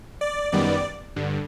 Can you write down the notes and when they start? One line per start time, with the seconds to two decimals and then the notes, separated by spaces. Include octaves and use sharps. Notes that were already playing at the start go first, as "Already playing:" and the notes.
0.21 D5
0.52 F#2 D#3 G3 B3 D5
1.16 G2 D3